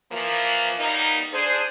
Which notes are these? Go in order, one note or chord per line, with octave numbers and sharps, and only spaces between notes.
E3 F3 A#3
G3 A#3 B3 D#4
D4 G#4 C5